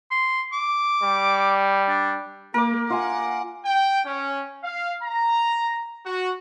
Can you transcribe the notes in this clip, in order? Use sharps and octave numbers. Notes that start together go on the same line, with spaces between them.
C6
D6
G3
D4
A#3 A#4 D6
F4 F#5 G#5
G5
C#4
F5
A#5
F#4